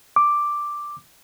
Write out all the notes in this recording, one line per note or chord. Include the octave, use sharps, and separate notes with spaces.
D6